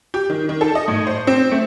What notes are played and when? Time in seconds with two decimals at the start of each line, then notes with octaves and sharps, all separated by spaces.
0.14 G4
0.30 D#3
0.49 D#3
0.61 A4
0.75 D#5
0.88 A2
1.07 C5
1.27 C4
1.51 A3